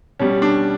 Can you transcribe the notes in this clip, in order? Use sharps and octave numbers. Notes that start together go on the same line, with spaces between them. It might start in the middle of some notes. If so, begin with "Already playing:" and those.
B2 G3 C#4
D4